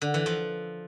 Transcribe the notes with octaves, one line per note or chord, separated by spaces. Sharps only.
D3
E3
F3